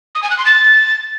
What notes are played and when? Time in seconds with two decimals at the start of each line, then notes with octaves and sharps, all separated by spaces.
0.15 D#6
0.23 G#5
0.30 F#6
0.38 C6
0.46 A6